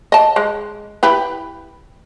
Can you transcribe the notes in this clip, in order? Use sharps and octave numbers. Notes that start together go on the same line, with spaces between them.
D#5 A5
G#3
E4 G4 B4